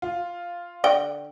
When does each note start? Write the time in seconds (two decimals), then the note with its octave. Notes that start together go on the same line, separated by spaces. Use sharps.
0.02 F4
0.84 D3 G5